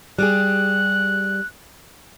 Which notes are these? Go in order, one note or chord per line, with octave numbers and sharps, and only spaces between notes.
G3 G4 G#4 F#6